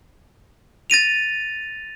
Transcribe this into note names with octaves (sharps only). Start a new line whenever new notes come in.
A6 A#6 D#7 F7